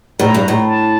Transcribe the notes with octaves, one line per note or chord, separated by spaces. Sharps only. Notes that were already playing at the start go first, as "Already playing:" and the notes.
A2 A#5
G2
A2
A5